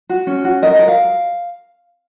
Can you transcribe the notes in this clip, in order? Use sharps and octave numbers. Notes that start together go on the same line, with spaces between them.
F#4
C#4
F#4
A#4 D#5
A#4
F5